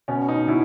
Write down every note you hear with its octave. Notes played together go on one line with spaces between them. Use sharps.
B2 C#4
D#4
B2 E4